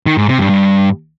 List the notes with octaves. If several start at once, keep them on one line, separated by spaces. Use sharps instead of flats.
D#3
G#2
C3
G2
G2